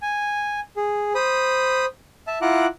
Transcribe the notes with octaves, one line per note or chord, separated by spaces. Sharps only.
G#5
G#4
C5 B5 D#6
E5 A5
E4 F4 F#5 A#5 D6 F#6